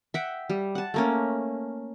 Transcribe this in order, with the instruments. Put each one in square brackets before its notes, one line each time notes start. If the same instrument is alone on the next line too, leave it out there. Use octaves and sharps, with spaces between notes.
[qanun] E5 F#5 G5
G3
F#5 A5
A3 A#3 C#4